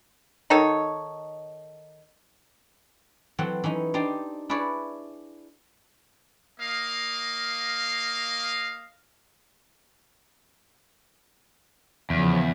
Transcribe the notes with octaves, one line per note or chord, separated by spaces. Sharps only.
D#3 D#4 A4 C#5
E3 F#3 C4 A4 F#5 G5
E3 C#4 D#4
D4 D#4 G4 C5 D5
D4 E4 G#4 B4 C#5 D5
A#3 D#5 F5
E2 C#3 F3